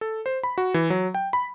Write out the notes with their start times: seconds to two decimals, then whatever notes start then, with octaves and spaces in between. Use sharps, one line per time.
0.01 A4
0.26 C5
0.43 B5
0.58 F#4
0.74 E3
0.90 F#3
1.15 G5
1.33 B5